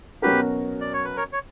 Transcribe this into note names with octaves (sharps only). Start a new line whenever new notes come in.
B2 F#3 C#4 F#4 G4 A#4 B4
D5
C#5
B4
A#4 C#5
C#5